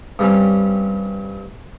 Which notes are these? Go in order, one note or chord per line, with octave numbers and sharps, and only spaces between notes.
G2 G3 C4 C#4